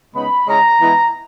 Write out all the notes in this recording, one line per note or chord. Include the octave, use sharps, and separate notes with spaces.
C#3 G#3 B3 D#4 B5
C#3 G#3 C#4 E4 A#5
E3 G#3 B3 E4